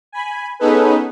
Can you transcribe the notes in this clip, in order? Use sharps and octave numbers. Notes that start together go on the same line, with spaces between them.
G#5 B5
B3 C#4 D#4 G#4 A4 B4